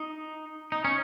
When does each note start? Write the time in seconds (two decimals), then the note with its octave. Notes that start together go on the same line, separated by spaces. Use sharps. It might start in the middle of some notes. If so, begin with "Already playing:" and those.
Already playing: D#4
0.72 D#4
0.85 C#4